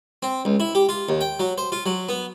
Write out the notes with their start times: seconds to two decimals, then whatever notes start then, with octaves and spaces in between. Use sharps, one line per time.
0.23 C4
0.45 C#2
0.60 E4
0.75 G4
0.89 F4
1.09 D#2
1.21 G5
1.40 F#3
1.58 C5
1.72 F4
1.86 F#3
2.09 B3